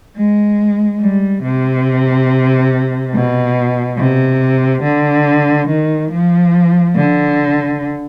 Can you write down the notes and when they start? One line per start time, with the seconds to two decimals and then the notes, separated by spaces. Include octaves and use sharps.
0.17 G#3
1.01 G3
1.44 C3
3.14 B2
3.98 C3
4.83 D3
5.69 D#3
6.11 F3
6.95 D3